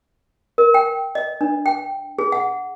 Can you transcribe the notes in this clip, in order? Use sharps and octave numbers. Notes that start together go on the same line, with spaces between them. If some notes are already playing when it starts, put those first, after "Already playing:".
A#4
G5
D#5
D4
G5
G#4
F#5